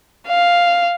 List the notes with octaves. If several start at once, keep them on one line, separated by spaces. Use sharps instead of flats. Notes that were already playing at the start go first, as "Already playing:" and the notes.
F5